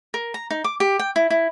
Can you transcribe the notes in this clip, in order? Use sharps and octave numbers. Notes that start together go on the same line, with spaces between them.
A#4
A#5
D#4
D6
G4
G5
E4
E4